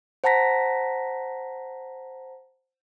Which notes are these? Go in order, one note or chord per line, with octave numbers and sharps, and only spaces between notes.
C5 F#5 A5 A#5 A#6 B6